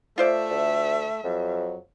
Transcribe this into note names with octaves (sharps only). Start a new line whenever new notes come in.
A3 F4 C5 D5 E5
D2
F2 F#3